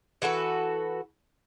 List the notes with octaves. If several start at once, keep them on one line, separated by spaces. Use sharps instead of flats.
E3 F#4 A4 B4